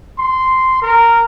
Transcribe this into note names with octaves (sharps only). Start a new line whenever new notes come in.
C6
A#4